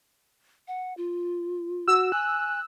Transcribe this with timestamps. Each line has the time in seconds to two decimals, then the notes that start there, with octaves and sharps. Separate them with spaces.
0.68 F#5
0.97 F4
1.88 F#4 E6
2.12 G#5 F#6